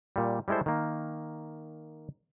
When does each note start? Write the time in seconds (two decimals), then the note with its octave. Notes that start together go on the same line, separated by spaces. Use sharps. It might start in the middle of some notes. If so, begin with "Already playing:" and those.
0.16 A#2 G3
0.48 G3 G#3 E4 A4 C5
0.66 D#3 A#3